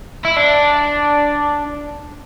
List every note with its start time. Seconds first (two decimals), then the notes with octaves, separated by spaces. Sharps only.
0.25 E4
0.36 D4